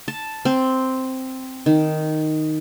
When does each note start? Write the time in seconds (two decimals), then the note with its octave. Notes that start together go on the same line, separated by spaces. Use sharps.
0.08 A5
0.45 C4
1.66 D#3